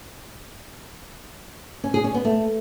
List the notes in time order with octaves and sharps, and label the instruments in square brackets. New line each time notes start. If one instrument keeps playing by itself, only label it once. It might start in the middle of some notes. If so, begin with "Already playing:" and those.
[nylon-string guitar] C#4
G#4
C#4
B3
A3